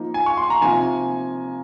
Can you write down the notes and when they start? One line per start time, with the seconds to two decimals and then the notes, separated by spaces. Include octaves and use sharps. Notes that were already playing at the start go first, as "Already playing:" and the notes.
Already playing: F3 A#3 D#4
0.14 G#5
0.26 C#6
0.37 C6
0.50 A#5
0.61 C3 F3 A#3 D#4 G#5